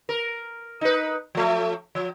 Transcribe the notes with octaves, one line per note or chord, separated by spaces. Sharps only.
A#4
D#4 B4
F3 A3
F3